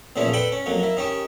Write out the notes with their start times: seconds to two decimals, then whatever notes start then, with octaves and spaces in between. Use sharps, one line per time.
0.16 E2 A#2 C#3 F3 C#4 E4
0.33 A4 B4 D5 G5 B5
0.52 C#4
0.66 F2 F#3 A#3
0.79 A#3 E4
0.97 D#3 C#4 G4